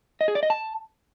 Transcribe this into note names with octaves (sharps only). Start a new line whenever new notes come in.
D#5
G#4
D5
D#5
A5